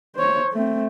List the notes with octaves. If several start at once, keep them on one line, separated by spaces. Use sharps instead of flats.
C5 C#5
A3 C4